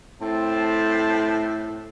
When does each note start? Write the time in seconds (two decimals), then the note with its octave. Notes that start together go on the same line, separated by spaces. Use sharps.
0.21 A2 C4 A5